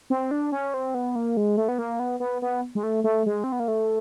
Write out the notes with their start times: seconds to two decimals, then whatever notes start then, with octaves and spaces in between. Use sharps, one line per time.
0.10 C4
0.31 D4
0.52 C#4
0.74 C4
0.94 B3
1.16 A#3
1.37 G#3
1.57 A3
1.68 B3
1.79 A#3
2.00 B3
2.20 B3
2.42 B3
2.75 G#3
2.83 A3
3.04 A3
3.26 G#3
3.44 C4
3.52 B3
3.60 A#3
3.68 A3